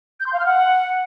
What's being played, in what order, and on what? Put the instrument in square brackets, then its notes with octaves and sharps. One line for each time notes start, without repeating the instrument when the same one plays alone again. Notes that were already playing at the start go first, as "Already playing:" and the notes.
[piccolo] G6
C6
F5
F6
F#5